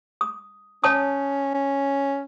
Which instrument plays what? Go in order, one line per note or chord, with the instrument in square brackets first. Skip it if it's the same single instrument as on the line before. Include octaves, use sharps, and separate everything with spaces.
[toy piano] D#6
[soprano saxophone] C#4 [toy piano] C#5 A5 D#6
[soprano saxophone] C#4